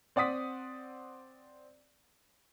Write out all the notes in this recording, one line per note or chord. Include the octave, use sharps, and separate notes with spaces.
C4 D5 F#5 D#6 B6